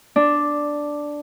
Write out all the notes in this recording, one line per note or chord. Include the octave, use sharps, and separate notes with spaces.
D4